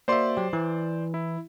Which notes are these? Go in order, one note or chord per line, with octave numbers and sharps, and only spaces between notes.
A#3 F#4 C5 D5 E5 C6
F#3 G4
E3
E4